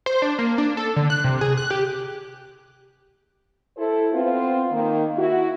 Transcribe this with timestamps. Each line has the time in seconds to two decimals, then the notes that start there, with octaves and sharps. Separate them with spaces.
0.06 C5
0.22 D4
0.38 A#3
0.58 D4
0.77 A4
0.96 D3
1.10 F#6
1.24 C3
1.41 G#4
1.57 F#6
1.71 G4
3.77 E4 A4 C5
4.13 B3 C4 F4
4.71 D#3 A#3
5.17 E4 F#4